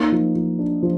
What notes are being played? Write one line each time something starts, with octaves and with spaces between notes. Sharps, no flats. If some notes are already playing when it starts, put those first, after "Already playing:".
Already playing: A#3 D#4
F3
F3
D4
F3